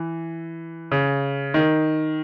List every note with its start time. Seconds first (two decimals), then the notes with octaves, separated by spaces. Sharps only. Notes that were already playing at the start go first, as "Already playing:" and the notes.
Already playing: E3
0.92 C#3
1.54 D#3